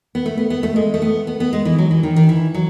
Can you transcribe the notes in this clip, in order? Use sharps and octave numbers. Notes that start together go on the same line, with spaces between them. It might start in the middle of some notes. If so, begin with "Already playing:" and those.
B3
A3
B3
B3
A3
G#3
A3
B3
B3
B3
G#3
E3
F#3
E3
D#3
D#3
E3
F#3